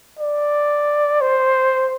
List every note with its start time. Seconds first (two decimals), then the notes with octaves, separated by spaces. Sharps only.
0.19 D5
1.21 C5